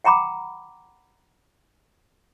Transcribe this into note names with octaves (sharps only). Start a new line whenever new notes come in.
F#5 G5 A#5 B5 D6